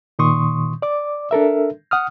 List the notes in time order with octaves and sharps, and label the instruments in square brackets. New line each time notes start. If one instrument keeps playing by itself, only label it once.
[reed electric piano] A#2 D#3 C6 C#6 D#6
D5 D6
D4 A4 A#4 E5
F#5 D#6 F6